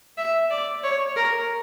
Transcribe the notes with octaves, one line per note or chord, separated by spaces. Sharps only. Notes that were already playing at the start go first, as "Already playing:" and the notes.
E5
D5
C#5
A#4